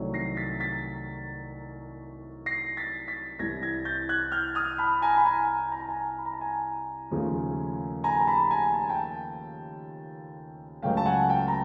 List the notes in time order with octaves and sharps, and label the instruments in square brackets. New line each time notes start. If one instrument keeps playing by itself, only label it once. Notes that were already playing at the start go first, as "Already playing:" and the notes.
Already playing: [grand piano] C2 C3 D#3 F#3 A3
A#6 C7
A6 B6
A6 B6
A#6 C7
A6 B6
A6 B6
C2 C3 E3 G#6 A#6
G#6 A#6
G6 A6
F#6 G#6
F6 G6
D#6 F6
A5 B5
G#5 A#5
B5
G#5 A#5
A#5
A5
G#5 A#5
B5
A#5
A5
G#5 A#5
D#2 C#3 F3 A3
G#5 A#5
A#5
A5 B5
G#5 A#5
A5
G#5
G5 A5
C#2 C#3 F#3 A3 F5 G5
A5
F#5 G#5
G5 A5
A#5